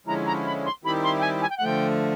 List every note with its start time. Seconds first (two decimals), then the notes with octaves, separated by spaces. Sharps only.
0.07 D3 F3 G#3 C#4 E4 A#5
0.26 A#5
0.45 B5
0.65 C6
0.84 D#3 G3 C4 E4 G4 B5
1.03 C6
1.19 G5
1.22 G#5
1.41 G#5
1.49 G5
1.57 F#5
1.61 D3 F3 A3 G5